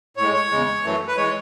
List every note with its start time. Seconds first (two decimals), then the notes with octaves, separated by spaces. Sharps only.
0.17 A2 C#5
0.22 G#3
0.34 C#5
0.51 E2 C#3 G#3
0.83 F#2 E3 A3
1.08 B4
1.17 E3 G#3 C#5